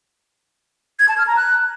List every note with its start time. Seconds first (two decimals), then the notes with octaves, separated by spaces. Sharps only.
0.99 G#6
1.09 A5
1.18 F6
1.27 A#5
1.36 F#6